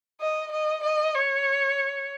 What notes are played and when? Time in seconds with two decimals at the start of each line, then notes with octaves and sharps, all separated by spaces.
0.21 D#5
0.52 D#5
0.84 D#5
1.15 C#5